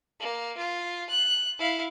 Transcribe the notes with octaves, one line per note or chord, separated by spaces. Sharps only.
A#3
F4
F#6
E4 F5